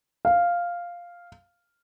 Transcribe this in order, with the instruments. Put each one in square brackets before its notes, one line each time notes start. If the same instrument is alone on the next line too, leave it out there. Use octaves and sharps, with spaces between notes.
[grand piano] F5